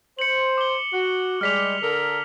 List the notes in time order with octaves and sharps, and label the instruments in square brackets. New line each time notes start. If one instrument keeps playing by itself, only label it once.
[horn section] C5 [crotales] C#7 F#7
[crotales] D6 G7
[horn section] F#4
[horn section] G3 G#3 [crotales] F6 B6 F7
[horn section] D3 A4 A#4